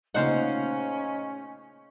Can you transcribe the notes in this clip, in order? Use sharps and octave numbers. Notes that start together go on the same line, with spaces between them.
A#2 C#3 A3 C#4 D#4 F4 C5 F#5